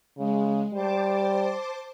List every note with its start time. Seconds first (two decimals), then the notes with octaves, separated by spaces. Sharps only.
0.18 C#3 G#3
0.74 G3 C5 A5 D6